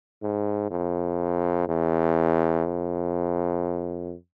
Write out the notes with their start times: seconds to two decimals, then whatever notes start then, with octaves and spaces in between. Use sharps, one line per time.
0.22 G#2
0.71 F2
1.68 E2
2.66 F2